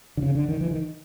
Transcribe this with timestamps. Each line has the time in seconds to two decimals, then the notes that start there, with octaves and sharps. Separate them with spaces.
0.17 D3
0.23 C#3
0.35 D3
0.49 D#3
0.61 E3
0.71 D#3